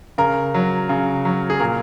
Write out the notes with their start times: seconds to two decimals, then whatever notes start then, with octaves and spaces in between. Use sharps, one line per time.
0.18 C#3 A#4
0.54 F#3
0.89 C#3
1.25 F#3
1.50 G#4
1.60 A#2 A#4